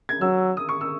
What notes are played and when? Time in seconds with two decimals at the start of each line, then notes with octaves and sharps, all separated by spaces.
0.09 G#6
0.21 F#3 E6
0.57 D#6
0.69 C#6
0.81 E6